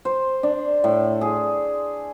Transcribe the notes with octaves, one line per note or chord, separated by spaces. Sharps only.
C5
D4
A2
G#4